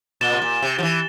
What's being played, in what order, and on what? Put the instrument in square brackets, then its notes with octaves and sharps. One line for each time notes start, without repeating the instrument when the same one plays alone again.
[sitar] A#2 [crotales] A6 E7 G7
[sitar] C3
A#2
C3
F3
E3